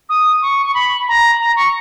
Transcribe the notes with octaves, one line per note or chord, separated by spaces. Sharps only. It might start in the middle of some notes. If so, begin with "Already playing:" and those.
D#6
C#6
C#6
B5
A#5
A#5
C#6